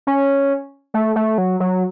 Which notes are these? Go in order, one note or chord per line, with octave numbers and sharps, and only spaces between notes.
C#4
A3
A3
F#3
F#3